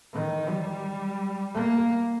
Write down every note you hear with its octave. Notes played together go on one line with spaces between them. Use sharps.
D#3
G3
A#3